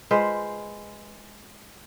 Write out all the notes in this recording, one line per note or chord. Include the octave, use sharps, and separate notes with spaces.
G#3 F4 B4 C5